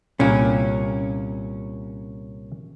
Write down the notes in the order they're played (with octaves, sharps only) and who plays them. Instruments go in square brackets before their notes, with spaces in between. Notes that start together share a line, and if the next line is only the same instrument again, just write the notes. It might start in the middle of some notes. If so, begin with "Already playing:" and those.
[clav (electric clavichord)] C2 A#2 A#3 [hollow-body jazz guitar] C#4